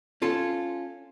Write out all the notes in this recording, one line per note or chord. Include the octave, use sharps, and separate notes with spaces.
C#4 F4 A4